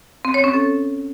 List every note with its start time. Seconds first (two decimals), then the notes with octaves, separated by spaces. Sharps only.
0.25 C4
0.34 C#5
0.44 C#4
0.54 A4